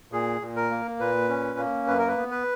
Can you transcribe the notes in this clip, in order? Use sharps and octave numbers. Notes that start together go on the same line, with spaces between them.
A#2 G#4
A#2
A#4
A#3
A#2 B4
C#4
A#3
F#2 B4
A#4
B4
B3
B4